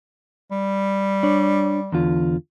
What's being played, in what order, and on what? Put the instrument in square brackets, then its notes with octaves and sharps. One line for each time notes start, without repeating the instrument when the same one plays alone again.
[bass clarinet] G3
[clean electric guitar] D4 C#5
E2 D3 F4